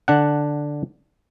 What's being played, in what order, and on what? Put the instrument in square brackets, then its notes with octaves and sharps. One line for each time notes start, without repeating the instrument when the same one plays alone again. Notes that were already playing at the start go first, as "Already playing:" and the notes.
[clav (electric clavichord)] D3 D4 F#5